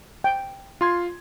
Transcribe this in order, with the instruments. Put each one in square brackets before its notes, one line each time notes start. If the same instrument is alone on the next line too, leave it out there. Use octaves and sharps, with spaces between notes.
[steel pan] G5
[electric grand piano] F4 C6 G#6